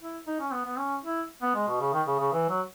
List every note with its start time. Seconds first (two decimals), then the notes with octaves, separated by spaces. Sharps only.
0.01 E4
0.27 D#4
0.40 C#4
0.52 B3
0.66 B3
0.78 C#4
1.04 E4
1.42 B3
1.55 G#3
1.68 B2
1.80 C#3
1.93 D#3
2.07 C#3
2.19 C#3
2.33 E3
2.49 F#3